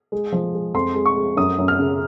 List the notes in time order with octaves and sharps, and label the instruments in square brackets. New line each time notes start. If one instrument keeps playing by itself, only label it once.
[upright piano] G#3
F3
G#3
F2 C6
G#3
C#6
G#3
F#2 D#6
F#2
F6
C#3